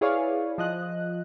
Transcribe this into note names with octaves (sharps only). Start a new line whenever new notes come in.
E4 G#4 B4 C#5 D5 F5
F3 D#5 F#6